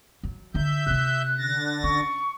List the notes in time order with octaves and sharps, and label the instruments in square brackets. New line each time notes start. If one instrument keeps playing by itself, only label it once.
[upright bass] F#3
[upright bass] D3 D#4 [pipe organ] E5 G6
[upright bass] C3 C#4 [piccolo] F#6
[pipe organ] D3 A6 A#6
[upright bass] C#4 [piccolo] C#6